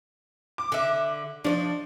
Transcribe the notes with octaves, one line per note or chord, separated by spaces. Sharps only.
D6
D3 E5
F3 D4 C#5 D#5